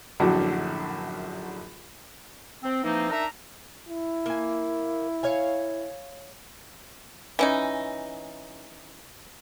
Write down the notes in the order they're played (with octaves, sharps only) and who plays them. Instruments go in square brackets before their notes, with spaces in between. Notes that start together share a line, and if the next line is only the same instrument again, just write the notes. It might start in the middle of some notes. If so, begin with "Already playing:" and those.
[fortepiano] A#1 F#2 A2 D3 F#3
[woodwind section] C4
E3 F3 A#3 C4 D#4
D4 D#4 A#4 E5 A#5
[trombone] E4
[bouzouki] A#3 G#5
C#5 F5 G#5
[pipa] E3 C#4 D#4